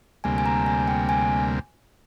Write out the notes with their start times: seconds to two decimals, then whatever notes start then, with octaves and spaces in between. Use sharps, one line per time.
0.24 D2 C3 G3 A#3 G#5
0.38 G#5
0.46 A#5
0.66 G#5
0.88 G5
1.09 G#5